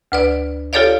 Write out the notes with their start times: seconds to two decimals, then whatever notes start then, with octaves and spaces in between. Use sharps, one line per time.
0.12 D2 B4 D5
0.73 F4 G4 A4 C#5 D5 F5